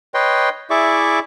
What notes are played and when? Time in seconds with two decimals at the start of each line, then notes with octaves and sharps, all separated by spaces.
0.14 B4 C#5 D#5 G5 C6
0.70 E4 G#4 D5 E5 C#6 D6